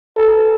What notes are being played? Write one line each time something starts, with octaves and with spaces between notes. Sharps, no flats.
A4